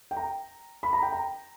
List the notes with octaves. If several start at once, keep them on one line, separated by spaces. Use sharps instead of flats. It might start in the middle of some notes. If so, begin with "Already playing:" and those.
G5
A#5
B5
A#5
G5
A#5